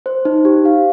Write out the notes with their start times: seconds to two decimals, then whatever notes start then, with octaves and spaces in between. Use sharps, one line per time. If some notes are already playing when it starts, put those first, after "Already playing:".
0.06 C5
0.25 D#4
0.45 G4
0.65 F5